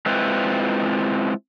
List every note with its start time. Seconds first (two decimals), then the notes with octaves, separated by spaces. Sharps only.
0.06 G#3 C4 E4 F4 B4 C5